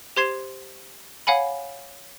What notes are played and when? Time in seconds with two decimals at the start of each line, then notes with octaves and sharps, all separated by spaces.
0.16 G4 C5 C6 G#6 C7 E7
1.27 C#5 F5 F#5 G#5 B5